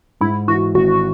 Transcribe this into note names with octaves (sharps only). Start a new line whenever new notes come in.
G#2 E4
E3 F#4
G#1 F#4